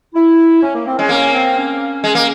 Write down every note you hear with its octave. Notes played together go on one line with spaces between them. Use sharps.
E4
C#4
A#3
C4
G#3 C#4
A#3 C#4
C4
C#4
G#3
A#3